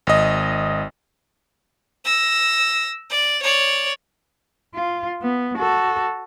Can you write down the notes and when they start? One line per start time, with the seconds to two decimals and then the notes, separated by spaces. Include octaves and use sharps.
0.07 G#1 D#5
2.04 E6 A#6
3.10 D5
3.43 C#5 D5
4.75 F4
5.22 B3
5.58 F#4 A4